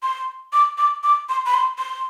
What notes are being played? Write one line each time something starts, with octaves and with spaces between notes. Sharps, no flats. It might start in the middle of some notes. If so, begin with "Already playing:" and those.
C6
D6
D6
D6
C6
B5
C6
C6